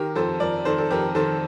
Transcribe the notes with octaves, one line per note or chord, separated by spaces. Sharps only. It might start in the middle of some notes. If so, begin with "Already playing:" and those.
Already playing: D#3 G4 A#4
F2 A4 C5
F2 A#4 D5
D#3 A4 C5
A4
F2 G4 A#4
D#3 A4 C5